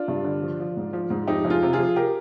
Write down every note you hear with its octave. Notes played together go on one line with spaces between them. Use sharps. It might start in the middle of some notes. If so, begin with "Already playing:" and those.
Already playing: D4 F4
G2
D3
F3
F3
G#2
F3
G#2
F2 D#4 G4
F2
F4 G#4
C3
F4 G#4
F3
G4 A#4